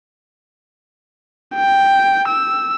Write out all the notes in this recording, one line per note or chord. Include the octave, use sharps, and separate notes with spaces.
G5
E6